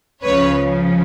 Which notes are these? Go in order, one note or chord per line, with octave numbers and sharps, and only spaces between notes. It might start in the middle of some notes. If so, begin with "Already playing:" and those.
C#2 C#3 F3 B4 C#5